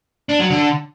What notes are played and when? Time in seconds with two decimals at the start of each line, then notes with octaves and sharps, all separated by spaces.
0.29 D4
0.40 F#3
0.50 D3